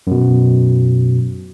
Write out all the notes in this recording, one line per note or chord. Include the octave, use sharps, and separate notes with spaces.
F#2 B2